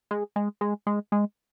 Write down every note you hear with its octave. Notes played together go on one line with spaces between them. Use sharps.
G#3
G#3
G#3
G#3
G#3